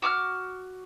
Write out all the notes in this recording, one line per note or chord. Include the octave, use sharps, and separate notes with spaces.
F#4 D6 D#6 F6